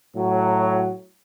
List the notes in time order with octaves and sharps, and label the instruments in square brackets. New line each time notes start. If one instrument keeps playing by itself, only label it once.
[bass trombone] A2 [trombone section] F#3